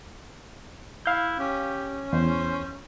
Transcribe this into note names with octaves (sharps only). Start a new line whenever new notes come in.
E4 F5 G6
C#4 G4
E2 C5